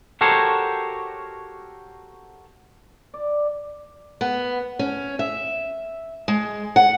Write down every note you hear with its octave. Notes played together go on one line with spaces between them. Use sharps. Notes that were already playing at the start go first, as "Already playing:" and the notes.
F#4 G4 A4 A#4 C5 C#5
D5
B3
C#4
E5
G#3
F#5